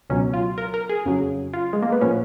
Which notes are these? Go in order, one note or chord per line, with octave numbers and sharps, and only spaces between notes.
C#2 B2 F#3 C#4
F4
A#4
A#4
G#4
F2 C#3 F#3
F4
G#3
A#3
B3
A#2 F3 C#4